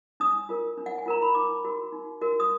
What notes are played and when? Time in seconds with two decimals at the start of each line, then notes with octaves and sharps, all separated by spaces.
0.20 D4 D#6
0.49 F4 A#4
0.78 D4
0.86 F#5
0.98 G#5
1.06 F4 A#4 A#5
1.22 B5
1.35 D#4 D6
1.64 F#4 A#4
1.92 D#4
2.21 F#4 A#4
2.40 D#6